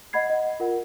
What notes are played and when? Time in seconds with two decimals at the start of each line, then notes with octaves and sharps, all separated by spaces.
0.13 D#5 F#5 B5 G#6 C7
0.30 D#5 F#5
0.60 F4 A#4 F#5